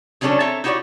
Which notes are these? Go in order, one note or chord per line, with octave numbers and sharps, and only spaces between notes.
C#3 F#3 G3 C#4 D4 A4
C4 A4 C#5 E5 A#5
D#4 E4 F#4 G4 C#5 D5